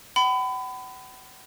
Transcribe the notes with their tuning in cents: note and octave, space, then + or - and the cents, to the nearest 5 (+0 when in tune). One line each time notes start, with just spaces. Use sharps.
F#5 +45 B5 +30